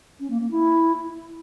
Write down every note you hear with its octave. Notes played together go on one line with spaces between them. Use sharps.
C#4
A#3
A#3
E4